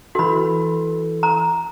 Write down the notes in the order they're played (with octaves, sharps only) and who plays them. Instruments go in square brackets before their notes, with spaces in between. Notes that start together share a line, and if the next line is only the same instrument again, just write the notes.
[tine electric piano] E3 A4 [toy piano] F#4 B5
[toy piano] A#5